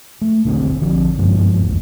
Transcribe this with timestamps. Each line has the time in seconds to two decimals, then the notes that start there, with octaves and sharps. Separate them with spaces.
0.21 A3
0.45 D#1 A#1 D3 C4
0.81 A#1 D3 F3
1.18 F#1 G2 F3 G#3
1.63 A#1 E2